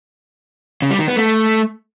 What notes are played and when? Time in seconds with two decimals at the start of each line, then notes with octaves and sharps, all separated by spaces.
0.82 C#3
0.91 G3
0.99 D#3
1.08 B3
1.16 A3